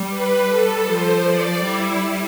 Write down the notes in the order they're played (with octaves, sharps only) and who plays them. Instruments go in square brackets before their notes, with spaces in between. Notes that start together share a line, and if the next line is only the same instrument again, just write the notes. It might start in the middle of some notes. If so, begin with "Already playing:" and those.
Already playing: [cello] G3
[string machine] B4
A4
[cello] F3 [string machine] C5
[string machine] D5
[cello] G3 [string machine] E4